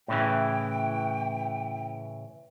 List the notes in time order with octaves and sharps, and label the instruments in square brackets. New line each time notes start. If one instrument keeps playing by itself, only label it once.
[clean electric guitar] A2 C#3 E3 [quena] G5